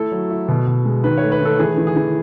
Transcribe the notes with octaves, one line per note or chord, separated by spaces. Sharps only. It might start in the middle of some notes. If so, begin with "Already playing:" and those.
Already playing: A3 E4 A4
F#3
E4
B2
B2
G#3
D#3 B4
A3 C#5
B4
D#3 A4
E3 G#4
E3
G#4
E3